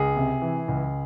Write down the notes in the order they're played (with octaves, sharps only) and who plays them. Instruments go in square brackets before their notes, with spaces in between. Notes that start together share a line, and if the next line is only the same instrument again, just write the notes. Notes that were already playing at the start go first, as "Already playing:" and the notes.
Already playing: [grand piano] C#2 G#4
C3
E3
C#2